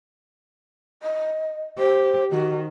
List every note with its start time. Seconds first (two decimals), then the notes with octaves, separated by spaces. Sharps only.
1.03 D#5
1.78 G4 C5
2.31 D#3 F#4